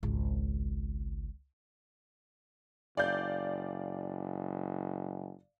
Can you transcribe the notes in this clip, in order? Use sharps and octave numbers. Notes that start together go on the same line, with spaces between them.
G#1 C#2
F#1 D5 F5 G6